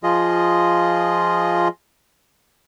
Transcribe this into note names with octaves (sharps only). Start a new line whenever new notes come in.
F3 F4 G#4 D#5